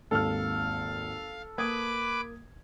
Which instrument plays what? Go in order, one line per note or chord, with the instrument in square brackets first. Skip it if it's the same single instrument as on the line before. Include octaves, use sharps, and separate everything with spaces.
[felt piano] G#1 D#2 [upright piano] A4 F6 [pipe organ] F5
[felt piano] A#3 D#6 G#6 [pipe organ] B4 D6